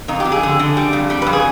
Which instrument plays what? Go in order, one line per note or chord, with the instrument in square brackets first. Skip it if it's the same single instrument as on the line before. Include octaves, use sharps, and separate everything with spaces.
[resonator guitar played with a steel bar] F2 D#4
G4
F2
G#4
D3
D3
G3
F2
G3
F2 B4
G#4